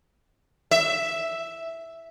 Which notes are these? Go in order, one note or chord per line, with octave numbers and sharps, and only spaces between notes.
E5